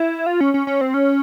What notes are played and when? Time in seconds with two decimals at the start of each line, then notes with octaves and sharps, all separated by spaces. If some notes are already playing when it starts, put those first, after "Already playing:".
Already playing: E4
0.26 F4
0.41 C#4
0.54 C#4
0.67 C#4
0.81 C4
0.94 C#4